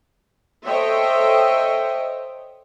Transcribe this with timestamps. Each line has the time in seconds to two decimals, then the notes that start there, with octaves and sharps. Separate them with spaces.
0.66 A4 C5 C#5 D#5 E5 G5